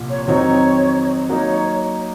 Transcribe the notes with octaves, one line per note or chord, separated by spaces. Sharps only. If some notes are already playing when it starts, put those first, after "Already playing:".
Already playing: C2 A#2 F3
C#5
F2 D#3 F#3 C4 D#4 C#5
F#3 A#3 D#4 C#5 D#5